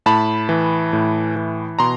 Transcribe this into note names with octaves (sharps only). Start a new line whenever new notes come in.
A2 A5 B5
E3
A2
E3
B2 A#5 C6